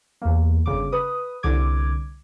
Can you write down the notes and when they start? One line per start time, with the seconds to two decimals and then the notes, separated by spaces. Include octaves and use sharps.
0.22 E2 A#3
0.66 G1 C#3 D6
0.92 B4 D#6
1.43 C2 D3 D6 G#6